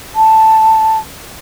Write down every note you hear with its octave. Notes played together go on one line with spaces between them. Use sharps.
A5